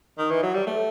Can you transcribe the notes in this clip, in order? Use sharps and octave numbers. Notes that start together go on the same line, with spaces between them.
D#3
E3
F#3
G3
A3